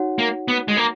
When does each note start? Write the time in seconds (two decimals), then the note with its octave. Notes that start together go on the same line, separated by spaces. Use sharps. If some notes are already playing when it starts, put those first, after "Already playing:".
Already playing: D#4 F#4 C#5 F#5
0.19 A#3
0.48 B3
0.68 G#3
0.77 A#3